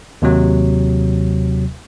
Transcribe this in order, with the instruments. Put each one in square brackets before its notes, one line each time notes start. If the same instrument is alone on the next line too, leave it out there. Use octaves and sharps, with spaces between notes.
[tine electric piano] D#2 C3 F#3